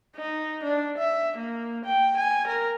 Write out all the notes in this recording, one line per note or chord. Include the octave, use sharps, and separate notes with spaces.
D#4
D4
E5
A#3
G5
G#5
A#4